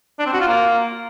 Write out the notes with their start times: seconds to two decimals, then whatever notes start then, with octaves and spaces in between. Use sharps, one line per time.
0.19 D4
0.26 C4
0.33 F#4
0.40 F4
0.48 A#3